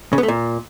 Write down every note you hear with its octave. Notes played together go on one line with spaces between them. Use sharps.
C#3
B3
A3
A#2